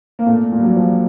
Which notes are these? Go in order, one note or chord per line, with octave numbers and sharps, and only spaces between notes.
A#3
A#2 A3
A#2
G3
F#3
F3